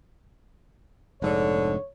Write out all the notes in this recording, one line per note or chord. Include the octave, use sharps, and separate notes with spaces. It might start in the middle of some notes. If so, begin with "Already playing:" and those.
F1 G#2 D3 C#5